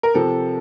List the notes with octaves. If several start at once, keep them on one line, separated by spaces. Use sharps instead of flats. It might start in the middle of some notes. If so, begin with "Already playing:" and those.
A#4
C3 F3 A4